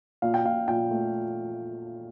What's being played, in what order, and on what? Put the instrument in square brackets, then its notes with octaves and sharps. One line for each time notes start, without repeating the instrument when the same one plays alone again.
[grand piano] A#2 F5
G5
A#2 F5
A#2 G5
A3